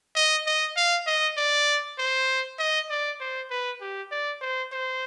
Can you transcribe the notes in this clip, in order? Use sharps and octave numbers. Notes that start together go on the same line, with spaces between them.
D#5
D#5
F5
D#5
D5
C5
D#5
D5
C5
B4
G4
D5
C5
C5